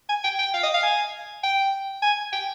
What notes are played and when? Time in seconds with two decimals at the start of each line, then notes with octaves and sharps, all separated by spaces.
0.09 G#5
0.24 G5
0.39 G5
0.54 F5
0.63 D#5
0.74 F5
0.83 G#5
1.44 G5
2.03 G#5
2.33 G5